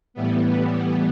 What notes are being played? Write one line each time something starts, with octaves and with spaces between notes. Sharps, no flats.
A2 E3 G3 B3